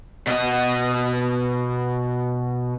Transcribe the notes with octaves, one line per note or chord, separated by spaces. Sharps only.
B2 D#5